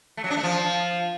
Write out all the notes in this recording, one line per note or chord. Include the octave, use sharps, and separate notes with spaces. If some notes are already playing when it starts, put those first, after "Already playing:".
A3
F#3
D4
A3
F3